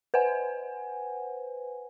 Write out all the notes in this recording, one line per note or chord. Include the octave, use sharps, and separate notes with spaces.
B4 C5 F#5 G#5